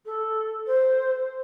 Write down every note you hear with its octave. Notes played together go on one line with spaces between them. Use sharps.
A4
C5